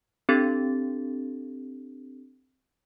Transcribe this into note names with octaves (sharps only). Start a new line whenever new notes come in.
C4 D4 G4 A4 A6